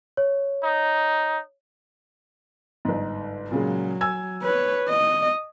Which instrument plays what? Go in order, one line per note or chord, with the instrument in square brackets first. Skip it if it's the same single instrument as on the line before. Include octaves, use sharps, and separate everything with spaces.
[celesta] C#5
[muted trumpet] D#4
[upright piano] G1 G#2
[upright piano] A#2 C#3 G#3 [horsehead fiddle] F#3
[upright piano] G#5 E6 G#6
[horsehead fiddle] B4 C#5
D#5